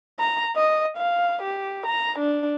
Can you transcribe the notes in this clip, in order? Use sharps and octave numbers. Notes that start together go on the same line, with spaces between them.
A#5
D#5
F5
G4
A#5
D4